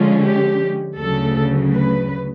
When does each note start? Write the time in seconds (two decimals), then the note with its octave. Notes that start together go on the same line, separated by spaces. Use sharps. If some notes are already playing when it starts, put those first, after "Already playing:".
Already playing: D3 F3 G#3 C#4 F4
0.24 G4
0.99 D2 C#3 F#3 A4
1.74 B4